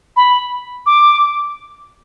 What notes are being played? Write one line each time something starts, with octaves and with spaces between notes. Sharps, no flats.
B5
D6